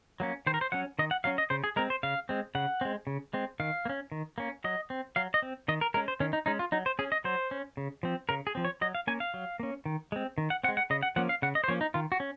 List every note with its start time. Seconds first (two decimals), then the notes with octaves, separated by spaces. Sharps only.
0.20 F#3 A#3 C#4
0.47 D#3 C5
0.54 A#4
0.61 C5
0.72 F#3 C#4 F#5
0.99 D#3 D#5
1.11 F#5
1.24 F#3 C#4 F5
1.38 D#5
1.50 C#3 C5
1.64 G#4
1.76 G#3 C4 A#4
1.90 C5
2.03 C#3 F5
2.29 G#3 C4
2.55 C#3 F#5
2.81 G#3 C4
3.07 C#3
3.33 G#3 C4
3.60 D#3 F5
3.85 A#3
3.89 C#4
4.12 D#3
4.38 A#3 C#4
4.64 F#3 D#5
4.90 C4
5.16 F#3 F5
5.34 D#5
5.42 C4
5.68 D#3 D#5
5.81 A#4
5.94 G#3 C#4 A#4
6.08 C5
6.20 D#3 C#4
6.33 D#4
6.46 G#3 C#4 D#4
6.59 F4
6.72 F#3 D#4
6.86 C5
6.99 C#4 G#4
7.12 D#5
7.24 F#3 C5
7.51 C#4
7.77 C#3
8.03 F3 C4
8.29 C#3 A#4
8.47 G#4
8.55 F3 C4
8.65 C#5
8.81 F#3 D#5
8.95 F5
9.07 A#3 C#4 G#5
9.20 F5
9.34 F#3
9.60 A#3 C#4
9.86 D#3
10.12 G#3 C4
10.38 D#3
10.50 F#5
10.64 C4 F#5
10.68 G#3
10.77 F#5
10.90 C#3 D#5
11.03 F#5
11.16 F3 A#3 C#4 F#5
11.29 F5
11.42 C#3 F#5
11.55 D#5
11.64 C5
11.68 F3 A#3 C#4 C#5
11.81 D#4
11.94 D#3 F4
12.12 F#4
12.20 C#4